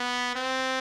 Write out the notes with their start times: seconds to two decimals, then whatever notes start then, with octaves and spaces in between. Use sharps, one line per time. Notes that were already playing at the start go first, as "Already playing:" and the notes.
Already playing: B3
0.36 C4